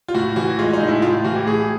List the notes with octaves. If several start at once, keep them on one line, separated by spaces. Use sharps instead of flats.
F4
A2 F#4
E3 F#4
G#3 F4
D#4
A2
E4
A2 F4
F4
E3 F#4
G4
A2 G#4